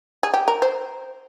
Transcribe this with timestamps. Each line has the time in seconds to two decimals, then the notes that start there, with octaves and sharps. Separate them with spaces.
0.23 G#4
0.34 G4
0.48 A#4
0.62 C5